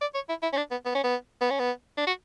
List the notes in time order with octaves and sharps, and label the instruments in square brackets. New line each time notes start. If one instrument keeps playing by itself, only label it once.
[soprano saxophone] D5
C#5
E4
E4
C#4
D4
B3
B3
C#4
B3
B3
C#4
B3
D4
F#4